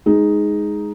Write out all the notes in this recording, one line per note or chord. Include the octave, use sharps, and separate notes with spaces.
G#3 D#4